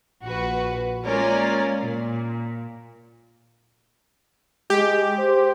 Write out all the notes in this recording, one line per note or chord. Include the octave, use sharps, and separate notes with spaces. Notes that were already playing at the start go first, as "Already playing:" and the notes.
A#1 F#4 B4
G#3 A#3 C#4 F4 A#4 D5
A#2
G#3 G4
C5